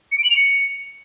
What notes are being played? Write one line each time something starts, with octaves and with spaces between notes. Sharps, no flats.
C#7
D7
F#7
F7
C#7